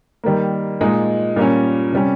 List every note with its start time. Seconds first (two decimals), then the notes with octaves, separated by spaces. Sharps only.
0.24 D#3 G3 A#3
0.81 A#2 G#3 D#4
1.36 A#2 G3 A#3 C#4
1.93 C3 G3 C#4